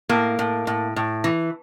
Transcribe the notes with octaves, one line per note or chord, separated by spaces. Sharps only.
A2 A#3
A2
A2
A2
E3